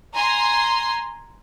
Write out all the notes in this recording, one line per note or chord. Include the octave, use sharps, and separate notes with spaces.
G#5 A#5 C6